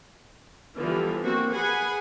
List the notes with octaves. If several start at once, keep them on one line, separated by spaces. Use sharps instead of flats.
D3 E3 F3 G3 B3
A#3 C4 F#4
G#4 B4 F#5 G#5